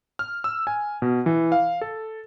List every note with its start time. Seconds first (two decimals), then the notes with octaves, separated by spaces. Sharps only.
0.19 F6
0.44 E6
0.67 G#5
1.02 B2
1.26 E3
1.52 F5
1.81 A4